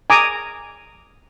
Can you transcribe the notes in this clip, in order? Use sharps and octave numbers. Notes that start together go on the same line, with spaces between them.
G#5 A#5 D6 D#6